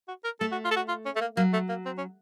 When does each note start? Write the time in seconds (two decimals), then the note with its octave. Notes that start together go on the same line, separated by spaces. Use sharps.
0.08 F#4
0.24 A#4
0.41 A3 A4
0.52 F#4
0.65 F4
0.71 A4
0.76 F#4
0.88 F4
1.06 C#4
1.16 A3
1.21 A#3
1.37 F#3 A#3
1.53 A3
1.69 A#3
1.86 C4
1.98 C#4